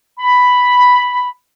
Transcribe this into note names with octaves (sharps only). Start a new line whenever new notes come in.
B5